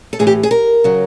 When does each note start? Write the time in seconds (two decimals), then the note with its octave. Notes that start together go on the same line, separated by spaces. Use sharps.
0.13 A4
0.19 A2 E3 G#4
0.27 G4
0.43 G#4
0.51 A#4
0.84 C#3 F#3